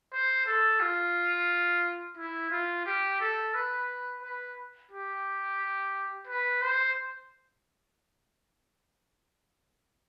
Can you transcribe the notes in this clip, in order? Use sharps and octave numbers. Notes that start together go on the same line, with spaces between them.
C5
A4
F4
E4
F4
G4
A4
B4
B4
G4
B4
C5